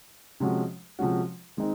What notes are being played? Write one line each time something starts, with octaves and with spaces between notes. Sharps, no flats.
C3 F3 G#3 C#4 F#4
C3 F3 G#3 C#4 F#4
D#3 G#3 C4 D#4